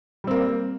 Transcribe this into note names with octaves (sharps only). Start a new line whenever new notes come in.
G3 A#3 C4